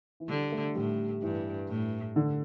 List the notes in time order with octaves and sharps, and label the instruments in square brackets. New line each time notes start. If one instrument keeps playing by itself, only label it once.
[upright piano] E3
[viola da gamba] D3 [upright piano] G3
[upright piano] A3
[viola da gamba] A2 [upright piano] G3
[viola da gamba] G2 [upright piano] E3
[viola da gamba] A2
[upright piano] D3